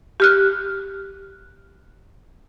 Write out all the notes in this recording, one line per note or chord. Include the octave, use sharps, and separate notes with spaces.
G4 F6 F#6